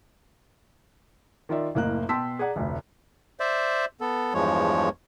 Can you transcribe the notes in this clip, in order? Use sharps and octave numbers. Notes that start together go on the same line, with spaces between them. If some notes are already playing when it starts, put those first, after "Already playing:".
D#3 F4 D5 E5
F#1 A2 A#3 D#5 F5 F#6
B2 G5 A5 C6 E6 B6
G#4 D5 F#5 A#5
F1 D2
C5 D5 E5
B3 A4
E2 G2 F3 G#3 C#5